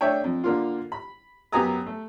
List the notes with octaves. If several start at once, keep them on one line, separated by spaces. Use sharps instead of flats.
A3 D4 C#5 E5 G5
F2
D3 A#3 F4
B5
F#2 B3 G4 G#5 A#5 D#6
A3